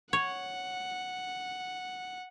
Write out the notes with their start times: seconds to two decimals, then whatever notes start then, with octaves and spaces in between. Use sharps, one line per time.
0.13 C#5 F#5